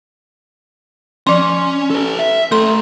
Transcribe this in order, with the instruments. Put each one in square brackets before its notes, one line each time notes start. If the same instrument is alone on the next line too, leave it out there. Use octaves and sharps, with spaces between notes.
[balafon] F3 C6 [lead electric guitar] C#4
[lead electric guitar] A4 B4
E5
[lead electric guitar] A3 B4 [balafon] A4 C6